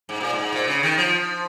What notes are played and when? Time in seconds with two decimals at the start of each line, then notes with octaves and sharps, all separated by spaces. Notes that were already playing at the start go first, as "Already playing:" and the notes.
0.09 G#2
0.21 A#2
0.33 G#2
0.53 A#2
0.68 C#3
0.83 D#3
0.98 F3